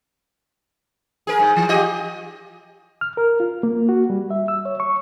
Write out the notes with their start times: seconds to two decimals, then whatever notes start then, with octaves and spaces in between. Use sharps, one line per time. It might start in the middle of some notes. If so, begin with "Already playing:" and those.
1.27 G#4 A#4
1.39 G#2
1.56 E3
1.69 F4 G4 D#5
3.01 F6
3.17 A#4
3.40 F4
3.63 A#3
3.89 F#4
4.10 G3
4.31 E5
4.48 E6
4.65 C#5
4.80 C#6